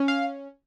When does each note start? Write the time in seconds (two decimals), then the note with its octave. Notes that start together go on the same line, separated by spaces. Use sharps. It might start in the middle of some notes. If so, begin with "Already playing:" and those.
Already playing: C#4
0.08 F5